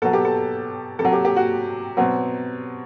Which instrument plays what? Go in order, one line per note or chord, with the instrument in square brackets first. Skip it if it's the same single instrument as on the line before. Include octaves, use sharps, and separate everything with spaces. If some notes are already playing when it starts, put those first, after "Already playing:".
[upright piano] B2 F#3 A4
G4
A4
C3 A4
F#3
G4
G4
F#4
B2 F#3 C4